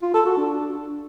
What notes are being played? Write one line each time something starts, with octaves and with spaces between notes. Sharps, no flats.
F4
A4
F#4
D4